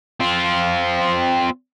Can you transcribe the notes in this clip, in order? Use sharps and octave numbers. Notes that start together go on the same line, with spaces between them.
C4 F4